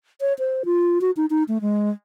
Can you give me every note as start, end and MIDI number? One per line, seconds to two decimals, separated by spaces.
0.21 0.33 73
0.39 0.63 72
0.65 1.01 65
1.01 1.11 66
1.17 1.26 63
1.30 1.43 63
1.48 1.58 57
1.62 1.90 56